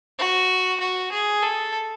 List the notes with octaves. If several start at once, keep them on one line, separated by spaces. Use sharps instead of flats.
F#4
F#4
G#4
A4